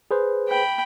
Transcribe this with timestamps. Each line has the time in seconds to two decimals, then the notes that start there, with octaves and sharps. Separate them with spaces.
0.11 G#4 B4 C5
0.49 G5 B5